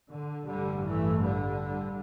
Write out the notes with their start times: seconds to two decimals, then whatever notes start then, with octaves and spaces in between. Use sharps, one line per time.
0.12 D3
0.49 A1 G2 D3 G3
0.86 E3 A3
1.22 D3 G3